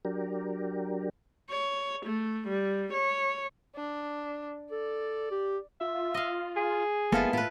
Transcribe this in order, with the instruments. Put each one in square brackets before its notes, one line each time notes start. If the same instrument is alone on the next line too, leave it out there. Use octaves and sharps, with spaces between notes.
[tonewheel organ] F#3 D4 G4 A#4
[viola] C#5
A3
G3
C#5
[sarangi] D4
[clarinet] A4 [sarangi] D5
[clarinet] G4
[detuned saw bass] F4 [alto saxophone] E5
[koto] D#5 F5
[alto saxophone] G#4
[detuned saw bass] F1 [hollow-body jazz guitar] G#3 A#3 B3 [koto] E4 F4 A4
[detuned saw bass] A2 [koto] E4 B4 [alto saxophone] F4